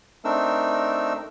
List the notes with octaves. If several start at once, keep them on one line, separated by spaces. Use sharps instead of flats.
A3 C4 D4 D#4 A#4 E6